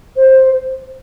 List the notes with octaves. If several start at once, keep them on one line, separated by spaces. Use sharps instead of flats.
C5